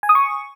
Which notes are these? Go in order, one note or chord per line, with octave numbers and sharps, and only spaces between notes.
G#5
D#6
C#6